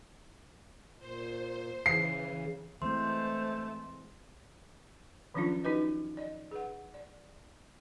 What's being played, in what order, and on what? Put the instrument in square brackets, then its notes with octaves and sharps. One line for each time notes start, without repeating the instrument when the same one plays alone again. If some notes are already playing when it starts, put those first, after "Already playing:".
[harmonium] A#2 [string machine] C5
[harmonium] C#3 [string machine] E3 [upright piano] C7
[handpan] E3 G#3 C4 [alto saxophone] A3 [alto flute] C5 [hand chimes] C6
[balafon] D#3 F3 F#3 C#4 D4 F4
D#4 F#4 B4 D#5
D5 D#5
G#4 B4 F#5
D5